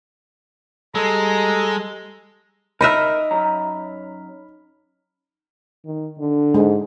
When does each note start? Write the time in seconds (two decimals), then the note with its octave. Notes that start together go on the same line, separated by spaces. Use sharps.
0.95 G3 G#3 A4 A#5
2.81 D#4 A#4 D#5 E5 B5 F6
3.31 F#2 A#5
5.86 D#3
6.20 D3
6.54 G#2 G#3